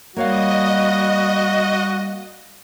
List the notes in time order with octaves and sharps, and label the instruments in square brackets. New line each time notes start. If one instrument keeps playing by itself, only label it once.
[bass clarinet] G3 [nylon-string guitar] A#3 C#5 F5 [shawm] F#4 [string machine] D#5